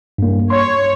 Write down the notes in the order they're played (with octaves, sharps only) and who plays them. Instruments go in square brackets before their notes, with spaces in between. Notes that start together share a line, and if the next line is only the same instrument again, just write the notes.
[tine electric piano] G2 A#3
[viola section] C#5 [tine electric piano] C6